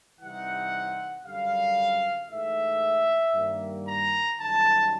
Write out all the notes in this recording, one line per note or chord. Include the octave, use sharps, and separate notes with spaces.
C3 E3 G3 C4 D#4 F#5
F#2 D3 G3 F5
G#2 E3 A3 E5
G2 D#3 G3 A#3
A#5
F#2 D#3 G3 A5